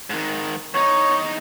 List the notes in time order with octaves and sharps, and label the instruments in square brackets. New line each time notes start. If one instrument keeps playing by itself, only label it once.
[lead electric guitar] G#2 D#3
[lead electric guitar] E2 D#4 [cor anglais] C#5